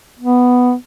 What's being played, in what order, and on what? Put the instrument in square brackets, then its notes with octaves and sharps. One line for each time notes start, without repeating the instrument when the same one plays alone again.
[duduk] B3